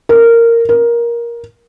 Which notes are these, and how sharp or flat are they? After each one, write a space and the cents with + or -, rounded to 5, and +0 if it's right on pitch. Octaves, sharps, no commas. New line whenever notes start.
A#4 -10
A#4 +15